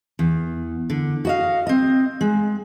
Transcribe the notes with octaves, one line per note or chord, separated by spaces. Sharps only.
E2
D3
F#4 D#5 F5
C4 D#5
G#3